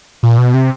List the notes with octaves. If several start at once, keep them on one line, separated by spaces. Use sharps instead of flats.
A#2
B2
C3